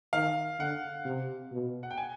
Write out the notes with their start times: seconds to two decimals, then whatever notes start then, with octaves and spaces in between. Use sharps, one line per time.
0.13 D#3 F5
0.59 D3 F#5
1.05 C3
1.52 B2
1.83 F#5
1.91 G5
1.98 G#5